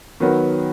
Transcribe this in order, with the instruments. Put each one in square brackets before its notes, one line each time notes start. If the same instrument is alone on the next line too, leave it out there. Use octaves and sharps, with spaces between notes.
[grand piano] D#3 F#3 B3